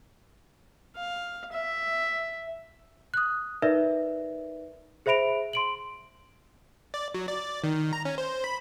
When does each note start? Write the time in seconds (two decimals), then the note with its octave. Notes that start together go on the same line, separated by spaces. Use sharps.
0.96 F5
1.52 E5
3.14 D#6 F#6
3.62 D#4 A#4 B4 D5 E5
5.06 G#4 C5 E5 B5 D7 F7
5.53 C6 D7 F#7
6.94 D5
7.15 F#3
7.28 D5
7.64 D#3
7.93 A#5
8.05 C#4
8.18 C5
8.44 B5